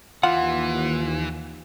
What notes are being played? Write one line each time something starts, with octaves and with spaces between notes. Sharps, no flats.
D#2 E3 F4 F#5